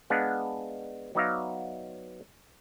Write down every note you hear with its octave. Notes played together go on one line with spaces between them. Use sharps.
G#3 B3 D4 F5 F#5
F#3 B3 D#4 D5 E5 F5